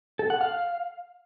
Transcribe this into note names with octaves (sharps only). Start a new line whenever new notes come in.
A4
F#5
F5